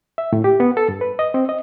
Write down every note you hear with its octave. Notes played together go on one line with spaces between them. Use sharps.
E5
A2
G4
B3
A4
G2
B4
D#5
C4
D#5